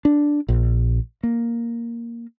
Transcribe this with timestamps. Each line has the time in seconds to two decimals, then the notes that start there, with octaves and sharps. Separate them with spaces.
0.05 D4
0.49 A#1
1.23 A#3